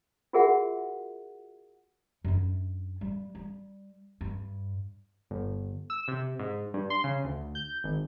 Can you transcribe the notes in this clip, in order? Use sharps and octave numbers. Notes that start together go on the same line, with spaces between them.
F4 F#4 G#4 A#4 E5 F#5
F#2 D4
G3
G3
G2
G1
E6
C3
G#2
G2
C6
C#3
D2
G6
G#1